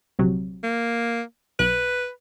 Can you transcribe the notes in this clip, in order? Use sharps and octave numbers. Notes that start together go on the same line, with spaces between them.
A#1 C3 F#3
A#3
B1 B4 F#6